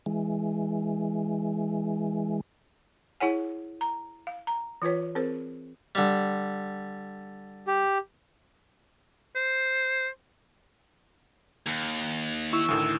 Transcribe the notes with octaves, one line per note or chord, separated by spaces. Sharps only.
E3 G#3
E4 G#4 C#5 F#5 G#5
A#5
F5
A#5
E3 F4 B4 C#5
C4 G#4 A#4 C5
D3 G3
G4
C5
D#2
E4 C#6 E6
D2 A2 D#3